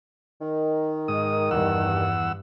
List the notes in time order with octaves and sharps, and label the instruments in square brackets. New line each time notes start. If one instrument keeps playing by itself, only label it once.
[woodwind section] D#3
[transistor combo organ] G#2 D#6
[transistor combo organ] E2 F#5 E6 [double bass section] G2